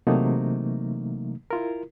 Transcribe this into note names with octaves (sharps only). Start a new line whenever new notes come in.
C3 E3 F#3 A3 A#3 D#4
E4 F4 A#4